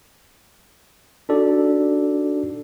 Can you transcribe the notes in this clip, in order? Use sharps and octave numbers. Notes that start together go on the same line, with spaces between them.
D4 D#4 F#4 A4 D5